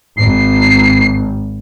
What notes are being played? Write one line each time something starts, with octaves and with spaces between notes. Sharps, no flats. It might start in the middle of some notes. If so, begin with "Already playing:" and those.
G#1 C7